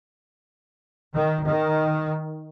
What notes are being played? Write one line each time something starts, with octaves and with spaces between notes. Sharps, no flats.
D#3
D#3